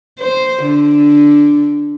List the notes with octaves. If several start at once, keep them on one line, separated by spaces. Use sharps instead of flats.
C5
D3